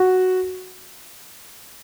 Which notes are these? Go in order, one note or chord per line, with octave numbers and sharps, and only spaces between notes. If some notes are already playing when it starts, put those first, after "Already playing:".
Already playing: F#4